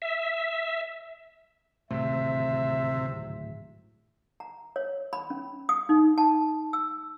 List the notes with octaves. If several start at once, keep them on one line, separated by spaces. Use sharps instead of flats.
E5
D1 G#1 C3 A3 E5
A#5
C#5
B5
C#4
D#6
D#4
A5
E6